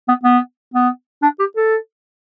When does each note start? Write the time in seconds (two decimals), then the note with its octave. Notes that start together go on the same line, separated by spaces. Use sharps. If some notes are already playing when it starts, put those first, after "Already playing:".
0.08 B3
0.24 B3
0.74 B3
1.22 D4
1.39 G4
1.56 A4